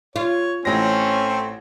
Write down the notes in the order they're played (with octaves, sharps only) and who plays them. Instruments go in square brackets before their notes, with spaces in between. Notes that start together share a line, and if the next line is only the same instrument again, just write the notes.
[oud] F4 [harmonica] C#5
[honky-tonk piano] A1 A#6 [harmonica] A3 C4 [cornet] C#4